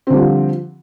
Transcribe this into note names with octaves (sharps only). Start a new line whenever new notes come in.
D3 F3 G3 C4